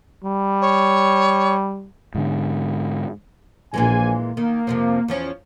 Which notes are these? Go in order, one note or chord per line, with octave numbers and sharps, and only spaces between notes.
G3
C#5
G#2 D3
A#1 A#2 E3 G#3 G#5
D#3 A#3
F2 C3 F3
E2 F3 C#4